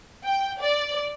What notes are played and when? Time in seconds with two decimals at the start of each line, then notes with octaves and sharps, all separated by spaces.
0.24 G5
0.61 D5